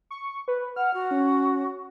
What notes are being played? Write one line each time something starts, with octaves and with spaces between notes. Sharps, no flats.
C#6
B4
F#5 F6
F#4
C#4